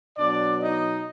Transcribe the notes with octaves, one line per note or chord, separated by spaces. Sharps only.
B2 F#3 D4 D5
D#4 D#5